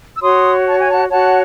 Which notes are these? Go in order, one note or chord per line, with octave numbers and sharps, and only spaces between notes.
E6
F#4 C#5 C6 D#6
A5
G#5
F#5 A5
F#4 C#5 F#5 A5